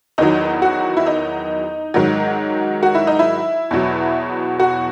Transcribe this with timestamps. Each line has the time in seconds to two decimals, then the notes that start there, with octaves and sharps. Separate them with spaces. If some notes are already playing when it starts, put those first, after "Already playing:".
0.18 E2 D#3 F#3 D#4
0.62 F#4
0.97 E4
1.07 D#4
1.94 G#2 D#3 F#3
2.83 F#4
2.95 E4
3.07 D#4
3.19 E4
3.71 E2 B2 F#3
4.60 F#4